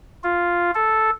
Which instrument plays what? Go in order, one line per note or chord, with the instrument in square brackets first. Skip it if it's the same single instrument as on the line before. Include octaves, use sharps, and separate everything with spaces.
[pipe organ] F4
A4